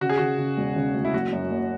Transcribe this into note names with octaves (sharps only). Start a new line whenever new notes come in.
C#3 F#4
G#4
C#3 F#4
C#3
E1
C#3
D2
E4
F#1 F#4
F#2
F#1